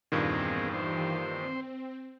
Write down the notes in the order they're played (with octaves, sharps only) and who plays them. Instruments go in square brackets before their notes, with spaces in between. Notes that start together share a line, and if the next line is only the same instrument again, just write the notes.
[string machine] E2 [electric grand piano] G2 A#2 D#3 [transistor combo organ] A#3 C4 G#4
[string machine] E3 G4 [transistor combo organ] C5
[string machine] C4